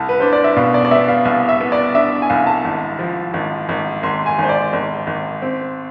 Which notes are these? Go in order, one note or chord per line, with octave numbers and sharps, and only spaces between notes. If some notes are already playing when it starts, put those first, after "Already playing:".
Already playing: C2 A5
B4
D4 C5
D5
E5
B2 F5
D5
D5
B3 E5
F5
C2 F5
E5
B3
D5
D4 E5
G#5
C2 F5
A5
G#1
F3
G#1
G#1
G#1 C6
G#5
G#1 C5
D5
G#1
G#1
C4